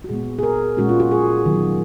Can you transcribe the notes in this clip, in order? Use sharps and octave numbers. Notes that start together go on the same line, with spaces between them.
F#4
A#2 G#3 B3 G#4
G#4
A#4
A#2 G#3 C#4 F#4
F4
F#4
G#4
D#3 F#3 B3